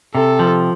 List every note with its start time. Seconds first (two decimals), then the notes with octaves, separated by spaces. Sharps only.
0.15 C3 A4
0.39 F3